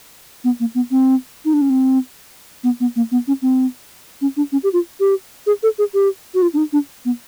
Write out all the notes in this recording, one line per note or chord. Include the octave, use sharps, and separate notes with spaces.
B3
A#3
B3
C4
D#4
D4
C#4
C4
B3
B3
A#3
B3
C#4
C4
C#4
D4
C#4
G4
F4
G4
G#4
A4
G#4
G4
F#4
F4
D4
D#4
D4
B3